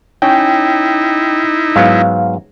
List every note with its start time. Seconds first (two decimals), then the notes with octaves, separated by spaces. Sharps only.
0.22 C#4 D#4 E4 G5
1.76 G#2 F#3 B3 F5